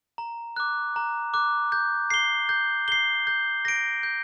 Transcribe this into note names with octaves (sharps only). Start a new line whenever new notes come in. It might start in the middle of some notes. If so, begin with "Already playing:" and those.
A#5
D6 F#6
A#5
D6 F#6
G6
C7 G7
G6
C7 G7
G6
A#6 D7
G6